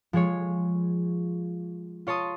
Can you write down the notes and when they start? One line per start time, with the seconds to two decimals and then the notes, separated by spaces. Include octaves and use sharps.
0.13 F3 G#3 G#4 C#5
2.07 F4 C#5 A5 C6 D#6